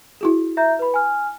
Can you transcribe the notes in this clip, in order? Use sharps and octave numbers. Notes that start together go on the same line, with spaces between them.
E4 F#4 G#4
E5 A#5 G6
B4 B5
G#5 F6